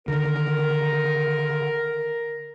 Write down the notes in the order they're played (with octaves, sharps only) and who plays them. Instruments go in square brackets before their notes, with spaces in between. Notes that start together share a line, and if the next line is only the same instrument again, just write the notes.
[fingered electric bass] D3 D#3 [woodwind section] A#4